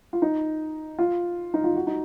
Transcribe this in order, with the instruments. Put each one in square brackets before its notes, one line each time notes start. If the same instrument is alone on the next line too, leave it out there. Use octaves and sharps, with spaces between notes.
[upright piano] F4
D#4
F4
D#4
F4
F#4
D#4